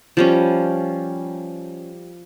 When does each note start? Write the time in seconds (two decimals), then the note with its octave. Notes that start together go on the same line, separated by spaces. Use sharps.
0.17 F3 G3 C#4